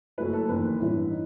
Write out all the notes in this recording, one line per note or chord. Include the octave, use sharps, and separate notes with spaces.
F#1 F#2 F#3 A3 E4 B4
A4
F#1 E2 D#3 B4
A1 G2 E3 B3 E4
D#4